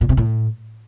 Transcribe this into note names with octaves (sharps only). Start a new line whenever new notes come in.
A#2
C3
A2